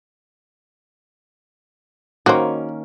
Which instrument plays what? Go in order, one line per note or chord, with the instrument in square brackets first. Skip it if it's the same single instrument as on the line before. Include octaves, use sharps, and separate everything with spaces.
[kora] D#3 A#3 C#4 [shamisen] F#4 C5